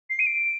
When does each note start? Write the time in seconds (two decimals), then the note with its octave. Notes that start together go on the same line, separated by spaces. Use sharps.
0.10 C7
0.19 D#7
0.26 D7